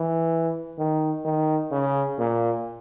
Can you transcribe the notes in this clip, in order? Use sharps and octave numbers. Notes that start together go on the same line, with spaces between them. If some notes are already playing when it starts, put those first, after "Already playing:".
Already playing: E3
D#3
D#3
C#3
A#2